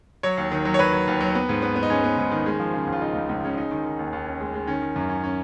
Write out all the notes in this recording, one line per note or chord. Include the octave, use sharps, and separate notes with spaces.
F#3 C#5
D#2
D#3
F#3
C#5
F#3 B4
F#3
D#2
F#3
B3
G#2
B3
B3
D#4
G#3 C#4
B3
G#2
D#3
G#3
F3
C#3
C#2
F4
C#3 D#4
C#2
C#2
G#3 C#4
C#4 D#4
D#3
D#3
D#2
D#2
C#4
G#3
G#3
D#3 C#4
D#3
F#2
C#4
C#4